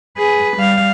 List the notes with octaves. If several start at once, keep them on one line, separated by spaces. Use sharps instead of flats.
G#4 B4
G3 F5